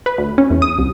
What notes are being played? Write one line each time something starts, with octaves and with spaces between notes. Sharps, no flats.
B4
D2
C#4
E2
D#6
C2